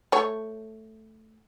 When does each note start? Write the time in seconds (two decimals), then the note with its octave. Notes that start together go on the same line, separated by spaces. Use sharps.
0.12 A3 C#5